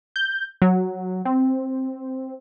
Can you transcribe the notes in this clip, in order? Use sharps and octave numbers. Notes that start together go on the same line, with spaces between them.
G6
F#3
C4